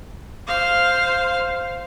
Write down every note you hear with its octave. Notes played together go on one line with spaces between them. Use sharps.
C5 F5